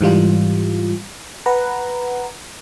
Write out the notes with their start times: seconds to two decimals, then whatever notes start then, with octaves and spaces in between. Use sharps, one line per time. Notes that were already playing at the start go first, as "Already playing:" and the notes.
0.01 G#2 E3 G3 F4
1.46 B4 F#5 A#5